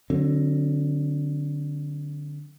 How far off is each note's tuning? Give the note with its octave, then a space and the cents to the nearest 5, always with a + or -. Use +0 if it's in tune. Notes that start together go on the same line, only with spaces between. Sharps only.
D3 +5 F#3 +0 C4 +40